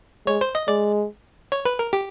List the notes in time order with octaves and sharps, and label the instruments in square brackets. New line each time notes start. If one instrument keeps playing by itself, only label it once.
[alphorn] G#3 [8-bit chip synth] C#5
[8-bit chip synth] C5
D#5
[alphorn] G#3 [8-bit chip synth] D5
[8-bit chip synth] C#5
B4
A#4
G4